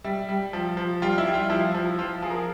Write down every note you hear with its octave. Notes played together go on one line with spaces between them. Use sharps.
G3 E5
G3
F3
F3
G3 F4
E4
G3
F4
F3 E4
F3
F3 F4
F3 G#4
A#4
G#4